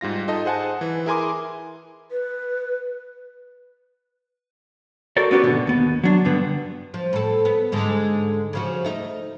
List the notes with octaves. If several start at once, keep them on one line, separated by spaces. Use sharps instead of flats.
G#2 G3 F4 A#6
D#4 F4 A4 D#5
G#4 C5 F#5 G#5 A5
E3
E4 G#4 A#4 G#5 C6 D6
B4
F#4 A4 A#4 C5 D5
B3 C#4 F#4 G4
D#2 G#2 B2 D3
D#2 B3
F#3 D4
G2 D3 B3
F3
A2 A4
B3
G#2 D3 G#3
C#3 F3 F#4
A3 D#4